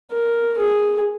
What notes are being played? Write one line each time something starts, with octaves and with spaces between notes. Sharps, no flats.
A#4
G#4